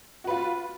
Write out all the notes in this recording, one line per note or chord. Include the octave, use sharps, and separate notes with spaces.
F4 F#4 B4